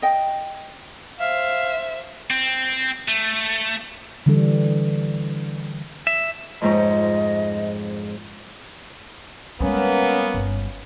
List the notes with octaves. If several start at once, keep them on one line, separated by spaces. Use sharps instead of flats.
D#5 G5
C5 E5 F5
C4
A3
D3 E3 G3 D4 A4
E5
F2 G#2 C#5 D#5
G3 G#3 A#3 B3 C#4
G1